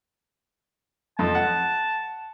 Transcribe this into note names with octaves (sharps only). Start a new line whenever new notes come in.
F2 A5
F#5